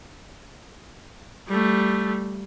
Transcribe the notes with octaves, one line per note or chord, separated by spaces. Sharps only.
G3 A3